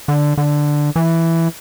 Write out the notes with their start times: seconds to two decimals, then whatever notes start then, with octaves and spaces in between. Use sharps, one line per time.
0.08 D3
0.38 D3
0.96 E3